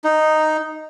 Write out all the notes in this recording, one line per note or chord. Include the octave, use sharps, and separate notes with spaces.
D#4